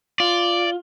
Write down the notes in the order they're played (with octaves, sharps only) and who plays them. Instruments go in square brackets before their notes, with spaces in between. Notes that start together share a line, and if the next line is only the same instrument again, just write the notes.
[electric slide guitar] F4 [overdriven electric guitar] D5